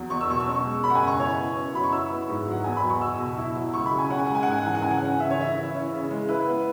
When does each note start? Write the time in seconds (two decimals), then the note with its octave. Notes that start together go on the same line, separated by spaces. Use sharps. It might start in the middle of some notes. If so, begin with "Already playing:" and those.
Already playing: E2 F#3
0.10 E2 C#6
0.21 E6
0.29 B2 C#6
0.40 E6
0.47 C#4 C#6
0.65 G#3
0.83 F#2 B5
0.90 F#5
0.95 G#5
1.02 C#3
1.07 C#6
1.20 E4 C#5
1.38 B3
1.56 F#2
1.74 F#3 B5
1.84 C#6
1.92 E4 E6
2.11 B3
2.29 G#2
2.47 F#3 F#5
2.64 E2 G#5
2.77 B5
2.83 F#3
2.90 C#6
3.01 E2 E6
3.20 B2
3.38 E4
3.56 F#3
3.74 C#2 C#6
3.86 B5
3.93 C#3
3.98 G#5
4.10 C#4 F#5
4.18 G#5
4.26 G#3 F#5
4.35 G#5
4.43 F#5
4.47 G#2 G#5
4.58 F#5
4.65 E3 G#5
4.75 F#5
4.82 C#3 G#5
4.91 F#5
5.02 C#4
5.19 C#3 E5
5.31 C#5
5.38 E3 E5
5.56 E4
5.74 C#4
5.92 C#3
6.10 G#3
6.29 E4 B4
6.47 B3